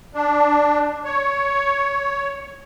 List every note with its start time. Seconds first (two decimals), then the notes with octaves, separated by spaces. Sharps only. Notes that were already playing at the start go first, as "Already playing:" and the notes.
0.15 D4
1.05 C#5